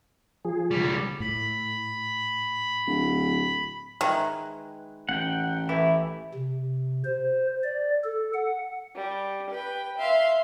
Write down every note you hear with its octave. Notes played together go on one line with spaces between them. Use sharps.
F3 G#4
C#2 G3
A2 B5
D1
D#3 G#3 E4 B4
A1 F#5 G5
E3 A3 E4 G4
C3
C5
D5
A4
F#5
G3
B4 G5
E5 F5 C6